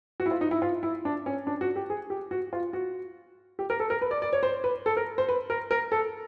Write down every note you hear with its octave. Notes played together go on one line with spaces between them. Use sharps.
F#4
E4
F4
D#4
E4
F4
E4
D4
C#4
D4
F#4
G4
G#4
G4
F#4
F4
F#4
G4
A#4
A4
A#4
B4
D5
D5
C#5
C5
B4
A4
A#4
C5
B4
A#4
A#4
A4